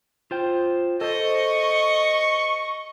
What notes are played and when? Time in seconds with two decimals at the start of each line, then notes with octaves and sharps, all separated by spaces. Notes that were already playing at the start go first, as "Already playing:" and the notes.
0.31 F4 C5 G5
1.01 A4 C5 D#5 C#6